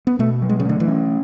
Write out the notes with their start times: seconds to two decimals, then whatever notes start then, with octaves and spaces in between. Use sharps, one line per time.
0.07 B3
0.19 B2 A3
0.42 F#3
0.49 G#3
0.60 C#3
0.65 D3 A3
0.80 E3
0.88 C#4